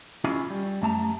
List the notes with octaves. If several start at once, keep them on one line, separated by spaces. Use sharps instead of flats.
C#4 E4 F4 G#4 D#5
G3
F#2 A3 A5 A#5